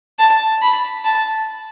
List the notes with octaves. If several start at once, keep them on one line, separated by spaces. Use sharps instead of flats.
A5
B5
A5